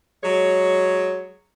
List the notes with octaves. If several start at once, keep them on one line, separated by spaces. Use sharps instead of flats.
F#3 G#3 C#5